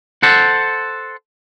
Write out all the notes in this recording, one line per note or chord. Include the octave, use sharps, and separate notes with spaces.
A4 C5 F#5